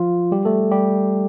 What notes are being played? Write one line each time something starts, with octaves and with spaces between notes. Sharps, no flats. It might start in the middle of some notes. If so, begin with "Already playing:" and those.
Already playing: F3 F4
G3 G4
A3 A4
G3 G4